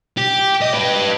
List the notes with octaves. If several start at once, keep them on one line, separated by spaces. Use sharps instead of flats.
G4
D#5
G4 B4